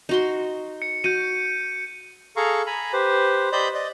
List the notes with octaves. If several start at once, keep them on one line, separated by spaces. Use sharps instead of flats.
D#4 F#4 C6
C#7
F#4 G6 C#7 D#7
G#4 A4 F5 A#5 C#6
G#5 A#5 B5
G4 B4 C5
G4 C5 D5 D#5 B5 G6
D5 D#5